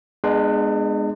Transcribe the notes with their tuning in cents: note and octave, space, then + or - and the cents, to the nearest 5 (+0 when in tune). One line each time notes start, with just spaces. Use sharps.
G#3 +0 B3 +0 D4 +40